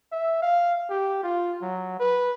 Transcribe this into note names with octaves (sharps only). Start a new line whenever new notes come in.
E5
F5
G4
F4
F#3
B4